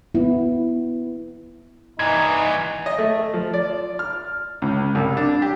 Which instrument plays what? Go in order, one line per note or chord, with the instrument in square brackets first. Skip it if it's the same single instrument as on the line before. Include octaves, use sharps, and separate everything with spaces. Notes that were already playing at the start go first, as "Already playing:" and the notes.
[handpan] B3 E4
[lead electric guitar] G2 E3 [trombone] D#4 [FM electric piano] G#6
[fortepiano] D#5
A3
F3
D5
F6
C#2
C2
D4
G4